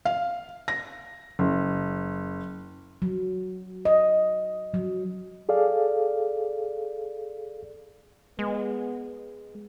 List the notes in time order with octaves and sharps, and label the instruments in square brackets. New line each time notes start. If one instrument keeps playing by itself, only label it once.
[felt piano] F5
A#6
F#1
[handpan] F#3
D#5
F#3
[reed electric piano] G#4 A4 D5 F5
[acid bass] G#3 [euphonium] B3